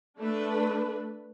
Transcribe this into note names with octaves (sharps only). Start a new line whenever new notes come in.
A3 D4 A4 B4